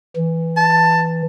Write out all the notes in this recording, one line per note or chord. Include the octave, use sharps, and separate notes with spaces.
E3
A5